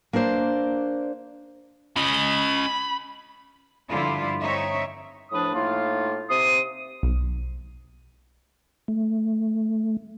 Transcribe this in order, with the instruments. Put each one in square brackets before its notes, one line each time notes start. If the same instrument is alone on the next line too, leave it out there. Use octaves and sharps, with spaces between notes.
[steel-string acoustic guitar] A#3 D4 A#4 C5 D5
[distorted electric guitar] C#4 D#5 [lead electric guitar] B5
[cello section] G2 D3 F3 E4 F4
C4 D#4 C#5 E5
[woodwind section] A2 F3 D4 B4 D#6
A2 A#3 D#4 F4
C3 C6 D#6
[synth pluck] B1
[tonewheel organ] A3